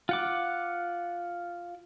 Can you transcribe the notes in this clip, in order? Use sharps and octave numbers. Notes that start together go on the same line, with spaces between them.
F4 F#5 D6